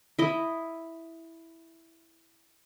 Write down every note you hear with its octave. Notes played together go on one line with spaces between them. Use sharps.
E4 D#5